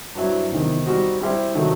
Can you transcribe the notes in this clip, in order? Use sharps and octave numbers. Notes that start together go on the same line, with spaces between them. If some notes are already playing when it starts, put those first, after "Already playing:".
G2 F#3 C4 E4
E2 C3 D#3
G3 C4 D#4 F#4
G3 C4 E4 G4 C5
C3 D#3 F#3 A3